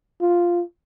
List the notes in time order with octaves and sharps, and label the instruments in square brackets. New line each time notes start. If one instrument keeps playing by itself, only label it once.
[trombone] F4